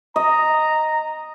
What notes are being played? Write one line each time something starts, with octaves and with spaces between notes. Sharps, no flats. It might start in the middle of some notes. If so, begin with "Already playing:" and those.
D#5 A#5